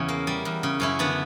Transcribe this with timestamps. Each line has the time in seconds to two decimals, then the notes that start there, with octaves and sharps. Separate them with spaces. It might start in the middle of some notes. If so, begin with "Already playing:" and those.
Already playing: E2 C#3 C#4 E4
0.09 A#3
0.27 G3
0.45 E2
0.63 C#3
0.80 F#2 C#4 E4
0.99 D3 B3 D4